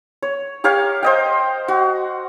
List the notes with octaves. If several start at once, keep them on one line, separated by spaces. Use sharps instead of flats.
C#5
G4 A#4 C#5 F5
C5 D#5 G5
F#4